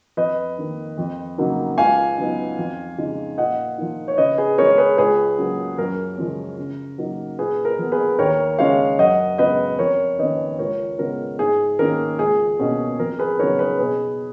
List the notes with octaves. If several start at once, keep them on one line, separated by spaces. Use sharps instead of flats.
F2 B4 D#5
D#3 A#3
F2
C#3 F#3 A#3 D#4
C#2 F5 G#5
C#3 F#3 B3 D#4
F2
C#3 G#3 D#4
A#2 D#5 F#5
F3 A#3 D#4
C#5
C#3 B4 D#5
G#4 B4
G#3 C#4 A#4 C#5
G#4 B4
C#2 G#4 B4
C#3 F#3 A#3
F#2 A#4
C#3 F3 G#3 C#4
C#3
F#3 A#3 D#4
A#2 G#4 B4
A#4
F3 B3
G#4 B4
D#2 A#4 C#5
C#3 G#3 C#4 C#5 F5
F#2 D#5 F#5
C#3 G#3 B3 B4 D#5
F2 A#4 C#5
D#3 A#3 C#4 B4 D#5
C#2 A#4 C#5
C#3 G#3 B3 A#4
G#2 G#4
D#3 A#3 C#4 A#4
C#2 G#4
B2 A#3 C#4
F2 A#4
G#4 B4
C#3 F#3 B3 D#4 A#4 C#5
G#4 B4
B2 G#4 B4